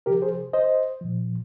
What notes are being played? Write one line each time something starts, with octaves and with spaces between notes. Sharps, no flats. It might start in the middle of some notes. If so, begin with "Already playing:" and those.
C3 F3 G4 A#4
G#4 C5
C5 D#5
A#2 F3